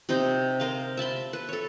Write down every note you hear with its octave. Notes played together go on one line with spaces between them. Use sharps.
C3 D#4 C5 D#5
A#4 C5 D#5 F5
E5 A5 B5 C6
B4
A4 C#5